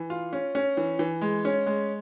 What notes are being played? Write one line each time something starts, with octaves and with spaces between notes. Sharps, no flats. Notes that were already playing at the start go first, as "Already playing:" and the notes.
Already playing: E3
F4
C#4
C#4
E3
E3
G#3
C#4
G#3